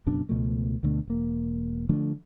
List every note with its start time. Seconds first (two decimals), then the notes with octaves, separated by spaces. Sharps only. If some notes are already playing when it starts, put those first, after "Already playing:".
0.06 F#1 F#2 B2 D4
0.29 C#2 B2 F3 A3
0.83 D2 B2 D3 A3
1.07 E1 A#3
1.89 D3 F3 A3 D4